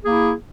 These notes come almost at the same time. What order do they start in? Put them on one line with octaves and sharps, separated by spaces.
G#4 A#3 E4